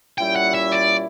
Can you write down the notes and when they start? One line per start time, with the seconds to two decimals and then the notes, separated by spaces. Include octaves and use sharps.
0.17 A#2 G3 C#4 E4 G5
0.36 F#5
0.54 E5
0.72 D5